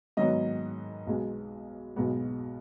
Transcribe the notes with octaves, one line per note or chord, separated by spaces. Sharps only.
G#2 D#3 F#3 B3 D#5
B1 B2 G#3 B3
B1 B2 G#3 B3